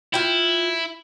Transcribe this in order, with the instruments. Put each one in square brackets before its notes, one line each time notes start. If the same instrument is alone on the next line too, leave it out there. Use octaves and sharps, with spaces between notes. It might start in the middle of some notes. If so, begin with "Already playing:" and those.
[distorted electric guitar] E4 [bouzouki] F4 G5